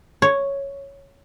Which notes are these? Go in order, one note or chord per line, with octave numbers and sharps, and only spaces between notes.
C#5